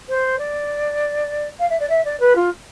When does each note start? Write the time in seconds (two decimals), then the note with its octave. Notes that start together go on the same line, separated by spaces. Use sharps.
0.08 C5
0.38 D5
1.59 F5
1.69 E5
1.79 D5
1.89 E5
2.04 D5
2.19 B4
2.35 F4